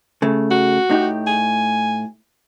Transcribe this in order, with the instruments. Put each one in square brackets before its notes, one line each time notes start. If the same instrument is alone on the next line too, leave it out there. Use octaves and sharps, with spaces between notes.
[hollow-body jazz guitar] C#3 A3
[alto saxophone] F#4
[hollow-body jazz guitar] A2 D#4 G4
[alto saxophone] G#5